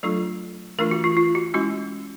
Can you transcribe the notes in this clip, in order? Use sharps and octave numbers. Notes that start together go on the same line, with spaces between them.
F#3 A3 D4 F4 A4
E3 A3 D4 F4 A#4
F#4
F4
F4
F#4
G#3 C#4 E4 F#4